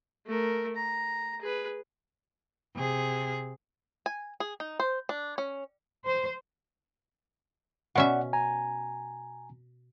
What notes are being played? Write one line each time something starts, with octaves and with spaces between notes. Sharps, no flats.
A3 A#4
A#5
G#4 B4
C3 G#4
G#5
G#4
D#4
C5
D4
C#4
C5
B2 C#4 D5 E5 F#5
G#5 A#5